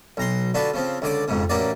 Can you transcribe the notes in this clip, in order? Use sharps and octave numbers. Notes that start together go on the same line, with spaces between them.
B1 A#5 C6
D3 D4 F4 F#4 B4
C#3 F3 C4
C#2 D3 D5 D6
F2 G#2 C#3
A1 A#3 C#4 F#4 D5